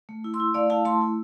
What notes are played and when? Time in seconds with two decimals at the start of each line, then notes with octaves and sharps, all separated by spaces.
0.09 A3
0.24 E4
0.34 C6 E6
0.40 E4
0.54 A3 D5 F5
0.70 E4 F5 A5
0.85 A3 A5 C6
1.01 E4